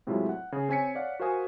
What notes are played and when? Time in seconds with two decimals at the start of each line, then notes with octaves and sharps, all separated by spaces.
0.07 A2 C3 F#3 G#3 E4 F4
0.29 F#5
0.52 C#3 G#4
0.69 C4 C#5 G#5 B6 C#7
0.95 C#5 D5 F5 F#5
1.20 F#4 A#4 C5 F5 G#5 D#6